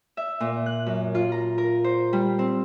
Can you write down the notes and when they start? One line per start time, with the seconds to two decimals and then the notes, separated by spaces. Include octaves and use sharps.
0.17 E5
0.40 A#2
0.66 F#6
0.86 F#2
1.15 F4
1.32 A#5
1.58 A#4
1.84 C5
2.13 G3
2.39 C4